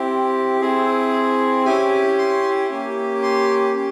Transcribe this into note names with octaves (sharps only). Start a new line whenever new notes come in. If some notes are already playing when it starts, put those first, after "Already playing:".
Already playing: C4 E4 G4
C4 E4 G#4
C#4 E4 G4 G#5
C6
A#3 C#4 G4
C6
C#4 G4